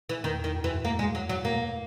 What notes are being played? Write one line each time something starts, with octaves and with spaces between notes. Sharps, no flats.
E3
E2 D#3
E2
D#3
F#2
E3
G#2
A#3
G#3
F#3
F#3
B2 A#3